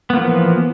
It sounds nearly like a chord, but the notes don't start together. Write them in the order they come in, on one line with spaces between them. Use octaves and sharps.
B3 A#3 F3 E3